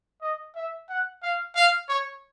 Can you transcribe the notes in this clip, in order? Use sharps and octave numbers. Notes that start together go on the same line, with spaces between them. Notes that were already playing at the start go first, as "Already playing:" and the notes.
D#5
E5
F#5
F5
F5
C#5